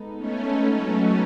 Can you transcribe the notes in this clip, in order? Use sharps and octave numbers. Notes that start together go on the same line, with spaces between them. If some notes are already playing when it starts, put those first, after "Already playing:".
Already playing: G#3 B3 D#4 A4
A3 C#4
F#3 A3